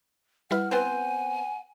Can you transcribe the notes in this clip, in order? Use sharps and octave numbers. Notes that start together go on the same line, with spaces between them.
G3 E4 B4 F#5 F6
B3 C4 C5 G#5